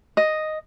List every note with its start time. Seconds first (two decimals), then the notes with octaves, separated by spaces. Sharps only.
0.17 D#5